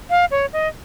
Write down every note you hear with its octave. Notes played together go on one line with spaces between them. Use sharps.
F5
C#5
D#5